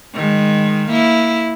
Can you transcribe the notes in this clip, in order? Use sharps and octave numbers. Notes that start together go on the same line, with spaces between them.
D#3 G#3
A#3 E4